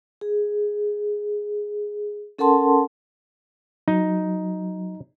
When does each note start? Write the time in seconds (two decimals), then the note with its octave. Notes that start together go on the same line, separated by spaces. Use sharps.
0.21 G#4
2.39 C#4 A4 A#4 F#5 A5 C6
3.88 F#3 D#4